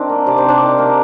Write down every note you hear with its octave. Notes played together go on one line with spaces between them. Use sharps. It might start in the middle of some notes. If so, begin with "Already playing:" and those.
Already playing: D#3 C4 D4 D5
A#3
C3 D5
C5
C3 D4 D5
D#3
A#3